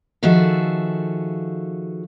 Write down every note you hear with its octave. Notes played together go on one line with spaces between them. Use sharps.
D#3 F3 F#4 G#4 A4 E5